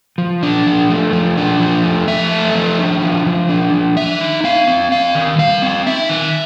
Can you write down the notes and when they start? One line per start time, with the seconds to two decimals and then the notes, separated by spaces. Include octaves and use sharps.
0.18 F3
0.43 D4
0.66 F3
0.90 A3
1.13 F3
1.37 D4
1.60 F3
1.84 A3
2.08 F3 E5
2.32 A3
2.54 F3
2.79 D4
3.02 F3
3.26 F3
3.49 D4
3.73 F3
3.96 D#3 E5
4.21 D#4
4.44 C4 F5
4.68 C4
4.92 C4 F5
5.15 D#3
5.38 G3 F5
5.62 C4
5.86 D#4 E5
6.09 D#3